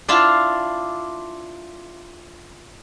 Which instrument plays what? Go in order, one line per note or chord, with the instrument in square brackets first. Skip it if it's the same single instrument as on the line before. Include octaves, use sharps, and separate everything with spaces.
[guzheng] D4 E4 F4 F5 A5